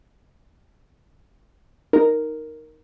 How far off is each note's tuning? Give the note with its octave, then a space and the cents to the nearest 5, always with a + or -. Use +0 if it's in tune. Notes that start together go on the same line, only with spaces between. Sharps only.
D#4 +0 A#4 +0